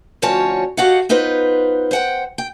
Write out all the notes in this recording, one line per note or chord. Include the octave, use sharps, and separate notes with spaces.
D2 F3 C#4 F#4 C#5 A5
F#4 G4 A4 D#5 F5 F#5
B3 D#4 F4 B4 C5
C5 F#5 G5
G5